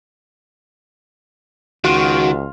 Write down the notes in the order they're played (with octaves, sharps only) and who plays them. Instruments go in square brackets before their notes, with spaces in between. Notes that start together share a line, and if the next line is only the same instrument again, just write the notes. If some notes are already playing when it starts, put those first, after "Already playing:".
[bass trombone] C#2 [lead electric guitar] D#3 [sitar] F4 [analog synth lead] F#4